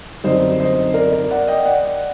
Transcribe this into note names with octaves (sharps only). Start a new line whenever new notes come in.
F#2 D3 G3 C4 D#4 C5 D#5
C5 D#5
A#4 D5
A#4 D5
D5 F#5
D#5 G5
D5 F#5